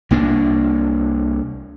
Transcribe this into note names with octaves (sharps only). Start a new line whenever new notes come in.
C2 A#3 D4